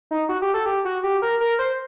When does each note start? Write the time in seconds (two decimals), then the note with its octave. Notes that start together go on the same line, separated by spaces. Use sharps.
0.11 D#4
0.29 F#4
0.42 G4
0.54 A4
0.66 G4
0.85 F#4
1.03 G4
1.22 A#4
1.41 A#4
1.59 C5